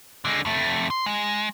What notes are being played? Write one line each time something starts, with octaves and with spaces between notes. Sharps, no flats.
D3 G#3
F2 A3
C6
G#3